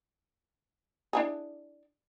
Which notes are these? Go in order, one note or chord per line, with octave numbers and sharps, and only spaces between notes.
D4 E4 G#4